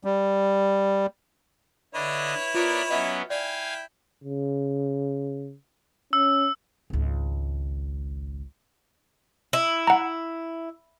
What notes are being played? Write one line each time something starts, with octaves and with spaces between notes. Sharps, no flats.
G3
D3 D4 E4 B4 C#5 D#5
B3 F4 A#4 D5
F#3 B3 C#4 D#5 E5
E4 D5 F5 G5 G#5
C#3
C#4 E6
G#1 C#2
E4
F#5 A#5